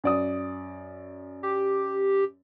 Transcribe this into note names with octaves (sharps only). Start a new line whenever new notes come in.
F#2 D5 D#6
G4